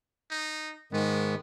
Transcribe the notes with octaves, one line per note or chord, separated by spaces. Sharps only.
D#4
G#2 D#3 G#3 B3